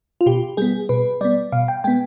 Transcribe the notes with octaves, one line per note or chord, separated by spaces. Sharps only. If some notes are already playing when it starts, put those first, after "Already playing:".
F4
B2 G4
G3 B3 G#4
B2 B4
G3 B3 D5
B2 F5
G5
G#3 B3 G5